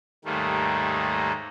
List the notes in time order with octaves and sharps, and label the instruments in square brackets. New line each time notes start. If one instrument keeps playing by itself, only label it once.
[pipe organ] D#2 G#2 D#3 G3 A3 A#3